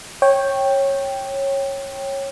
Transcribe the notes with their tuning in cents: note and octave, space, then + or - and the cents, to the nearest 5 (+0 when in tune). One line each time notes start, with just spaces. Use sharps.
C#5 -15 G5 +0